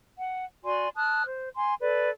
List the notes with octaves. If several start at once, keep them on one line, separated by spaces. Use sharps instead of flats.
F#5
F#4 D5 G#5 C6
A5 D#6 F6 F#6
C5
G#5 C6
A4 B4 D5